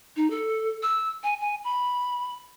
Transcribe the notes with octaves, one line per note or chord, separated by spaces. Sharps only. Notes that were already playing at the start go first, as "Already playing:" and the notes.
D#4
A4
E6
G#5
G#5
B5